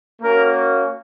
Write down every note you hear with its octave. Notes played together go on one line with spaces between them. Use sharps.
A#3 C#4 F#4 A#4